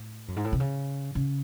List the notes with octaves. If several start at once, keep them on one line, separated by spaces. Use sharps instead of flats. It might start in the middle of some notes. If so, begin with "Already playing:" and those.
Already playing: A2
F#2
G#2
A2
C3
C#3
C#3